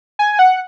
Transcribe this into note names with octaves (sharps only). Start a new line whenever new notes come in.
G#5
F#5